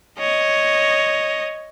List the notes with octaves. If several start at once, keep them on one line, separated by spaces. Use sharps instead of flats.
C#5 D#5